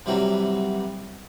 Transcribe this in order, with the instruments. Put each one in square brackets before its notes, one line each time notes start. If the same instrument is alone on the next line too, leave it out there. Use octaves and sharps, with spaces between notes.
[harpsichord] C3 E3 F#3 G3 C4